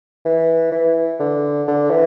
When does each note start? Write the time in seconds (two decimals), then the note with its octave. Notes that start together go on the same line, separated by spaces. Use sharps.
0.25 E3
0.72 E3
1.20 D3
1.68 D3
1.90 E3